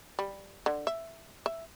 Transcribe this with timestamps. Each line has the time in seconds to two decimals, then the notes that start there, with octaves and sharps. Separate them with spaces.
0.19 G3
0.66 D3
0.87 E5
1.46 E5